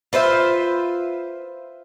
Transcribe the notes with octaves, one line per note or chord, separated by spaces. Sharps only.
F4 B4 C5 E5